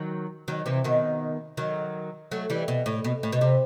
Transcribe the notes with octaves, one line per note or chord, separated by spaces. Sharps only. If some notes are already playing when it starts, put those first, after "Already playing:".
Already playing: D#3 F#3
D#3 F#3
C3 E3
B2 D#3
D#3 F#3
F#3 A3
E3 G3
B2
A2
B2
A2
B2
C3